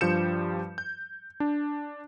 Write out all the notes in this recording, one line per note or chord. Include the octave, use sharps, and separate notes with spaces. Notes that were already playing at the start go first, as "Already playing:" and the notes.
G2 F3 G3 G6 C#7 E7
G6
D4